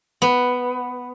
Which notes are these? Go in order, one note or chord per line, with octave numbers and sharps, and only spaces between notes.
B3